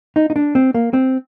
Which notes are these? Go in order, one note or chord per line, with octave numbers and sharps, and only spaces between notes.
D#4
D#4
D4
C4
A#3
C4